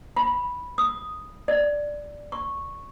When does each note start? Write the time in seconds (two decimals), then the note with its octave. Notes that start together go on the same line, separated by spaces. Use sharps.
0.16 B5
0.78 D#6
1.48 D5
2.32 C#6